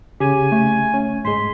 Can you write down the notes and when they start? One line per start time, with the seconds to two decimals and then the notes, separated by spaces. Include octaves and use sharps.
0.20 C#3 G4 G#5
0.52 A3
0.94 C#4
1.25 G#2 G#3 C6 B6